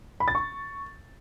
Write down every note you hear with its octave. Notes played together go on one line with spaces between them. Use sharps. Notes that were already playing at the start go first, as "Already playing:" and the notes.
B5
A6
C#6